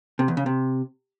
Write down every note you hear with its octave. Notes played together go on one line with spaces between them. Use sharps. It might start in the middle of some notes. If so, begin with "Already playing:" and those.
C3
E2
C#3
C3